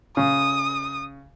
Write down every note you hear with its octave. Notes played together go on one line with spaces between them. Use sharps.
C#3 D#6